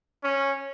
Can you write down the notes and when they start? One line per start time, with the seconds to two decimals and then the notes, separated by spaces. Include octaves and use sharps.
0.24 C#4